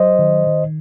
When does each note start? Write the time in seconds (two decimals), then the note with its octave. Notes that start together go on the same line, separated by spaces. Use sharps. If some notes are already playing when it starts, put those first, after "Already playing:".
Already playing: F#3 C5 D#5
0.19 D#3
0.47 D#3